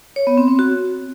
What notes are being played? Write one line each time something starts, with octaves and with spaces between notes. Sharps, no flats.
C#5
B3
C4
C4
F#4